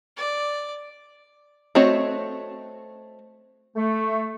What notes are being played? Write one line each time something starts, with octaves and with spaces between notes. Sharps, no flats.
D5
A3 C4 F#4 C#5 D#5
A3